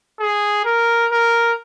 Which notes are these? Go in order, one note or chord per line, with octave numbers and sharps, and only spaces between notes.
G#4
A#4
A#4